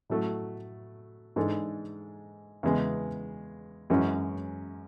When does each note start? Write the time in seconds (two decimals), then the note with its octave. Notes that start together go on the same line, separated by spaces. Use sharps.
0.10 A2 F#3 A3
1.36 G#2 E3 G#3 D4 A4
2.63 E2 C#3 G#3 B3
3.90 F#2 E3 G#3 C#4 F#4